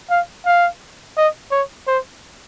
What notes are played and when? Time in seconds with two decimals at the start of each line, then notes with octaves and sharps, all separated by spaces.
0.10 F5
0.46 F5
1.17 D#5
1.51 C#5
1.87 C5